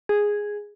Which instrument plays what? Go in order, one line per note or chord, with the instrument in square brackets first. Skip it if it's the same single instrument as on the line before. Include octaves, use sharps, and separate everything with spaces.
[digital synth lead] G#4